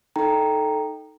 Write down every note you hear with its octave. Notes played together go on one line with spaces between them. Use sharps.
D#4 A4 G5 A#5